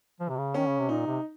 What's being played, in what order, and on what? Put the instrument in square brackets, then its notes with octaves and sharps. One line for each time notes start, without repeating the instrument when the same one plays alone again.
[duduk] F3
C3
C#3
[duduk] D#3 [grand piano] C#4
[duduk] C#3
C3
[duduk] A#2 [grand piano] D#4
[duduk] C3